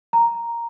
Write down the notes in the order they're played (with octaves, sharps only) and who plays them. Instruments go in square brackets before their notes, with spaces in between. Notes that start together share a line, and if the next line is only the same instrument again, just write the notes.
[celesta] A#5